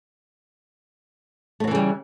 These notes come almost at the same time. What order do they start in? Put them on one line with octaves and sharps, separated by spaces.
A3 F#3 E3 C#3 G3